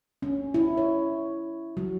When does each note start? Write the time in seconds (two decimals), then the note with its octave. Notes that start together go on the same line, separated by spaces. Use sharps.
0.22 C#4
0.54 E4
0.78 C#5
1.77 F#3